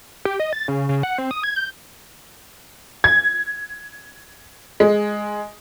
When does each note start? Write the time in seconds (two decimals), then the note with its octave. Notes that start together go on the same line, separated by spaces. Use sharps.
0.25 G4
0.40 D#5
0.53 A6
0.68 C#3
0.89 C#3
1.03 F#5
1.18 C4
1.31 D#6
1.43 G#6
1.56 G6
3.04 G#6
4.80 G#3